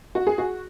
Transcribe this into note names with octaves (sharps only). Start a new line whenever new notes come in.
F#4
G#4
F#4